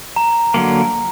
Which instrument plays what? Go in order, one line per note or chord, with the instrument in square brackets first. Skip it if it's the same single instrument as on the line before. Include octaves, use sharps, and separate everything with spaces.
[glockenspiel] A#5
[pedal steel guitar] D3 F#3 A#3